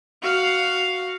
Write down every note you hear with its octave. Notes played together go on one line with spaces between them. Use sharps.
F#4 F5